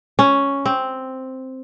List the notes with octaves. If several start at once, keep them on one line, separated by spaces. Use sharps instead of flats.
C#4
C4